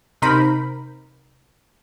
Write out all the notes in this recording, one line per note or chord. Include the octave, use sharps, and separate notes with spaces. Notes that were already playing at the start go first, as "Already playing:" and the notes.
C3 D#4 A#4 C5 B5